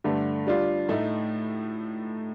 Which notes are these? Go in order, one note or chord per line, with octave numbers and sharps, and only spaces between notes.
G2 D3 A3
G3 D4 F4
A2 A3 D#4